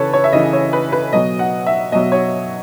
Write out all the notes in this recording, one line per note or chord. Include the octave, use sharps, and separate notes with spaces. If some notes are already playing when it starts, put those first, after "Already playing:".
Already playing: C#3 E3 A4 B4 C#5
C#5
E5
C#3 E3 D#5
C#5
B4
B4
B2 F#3 D#5
F#5
E5
B2 F#3 D#5
C#5